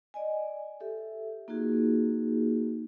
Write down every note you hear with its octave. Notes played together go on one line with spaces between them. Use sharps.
D5 D#5 G#5
G4 A4 E5
A#3 D#4 F4 F#4 G#4